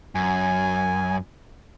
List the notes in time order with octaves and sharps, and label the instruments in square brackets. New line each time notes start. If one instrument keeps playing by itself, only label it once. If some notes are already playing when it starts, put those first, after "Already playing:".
[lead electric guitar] F#2 [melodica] G#5